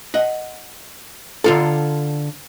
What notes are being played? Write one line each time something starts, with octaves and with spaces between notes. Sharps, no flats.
D#5 F#5
D3 F4 A4